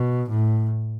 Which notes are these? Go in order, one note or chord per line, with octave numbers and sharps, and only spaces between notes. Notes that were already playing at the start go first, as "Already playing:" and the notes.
Already playing: B2
A2